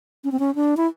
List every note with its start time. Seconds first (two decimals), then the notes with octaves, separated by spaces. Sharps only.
0.24 C#4
0.32 C4
0.39 C#4
0.55 D4
0.77 E4